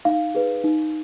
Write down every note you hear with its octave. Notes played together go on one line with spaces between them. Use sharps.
D#4 F5
G#4 B4
D#4